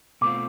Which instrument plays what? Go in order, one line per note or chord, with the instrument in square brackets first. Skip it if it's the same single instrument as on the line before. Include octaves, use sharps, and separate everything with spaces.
[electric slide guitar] B2 A3 C4 F4 [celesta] D6